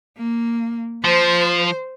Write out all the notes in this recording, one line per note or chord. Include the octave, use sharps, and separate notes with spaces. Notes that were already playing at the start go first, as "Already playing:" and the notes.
A#3
F3 C5